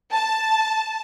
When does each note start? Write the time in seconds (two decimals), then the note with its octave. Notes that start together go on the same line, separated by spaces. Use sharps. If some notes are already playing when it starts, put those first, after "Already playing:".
0.12 A5